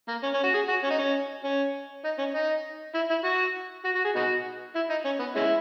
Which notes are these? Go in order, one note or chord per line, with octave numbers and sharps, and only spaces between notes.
A#3
C#4
C#4
F#4
G#4
F#4
C#4
D#4
C#4
C#4
D#4
C#4
D#4
E4
E4
F#4
F#4
F#4
G#4
B3 D#4 F#4
E4
D#4
C#4
B3
G#3 C#4 E4